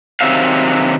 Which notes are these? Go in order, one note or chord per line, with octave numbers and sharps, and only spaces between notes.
C3 D#3 F#3 C4 E5 F5